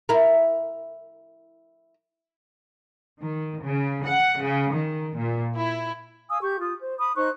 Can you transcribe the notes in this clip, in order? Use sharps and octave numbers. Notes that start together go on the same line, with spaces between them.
E4 A#4
D#3
C#3
F#5
C#3
D#3
A#2
E4
F5 G#5 D#6 E6
G4 C#6 G6
F4 D#6
C5
B5 D#6
D#4 C5 C#6 F#6